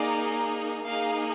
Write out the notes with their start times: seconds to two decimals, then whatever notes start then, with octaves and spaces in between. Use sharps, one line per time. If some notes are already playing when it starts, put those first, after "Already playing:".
Already playing: A#3 D#4 G#4 D5
0.86 A#3 D#4 G#4 F5